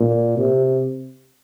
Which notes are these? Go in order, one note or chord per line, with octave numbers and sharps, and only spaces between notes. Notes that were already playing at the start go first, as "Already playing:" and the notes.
Already playing: A#2
C3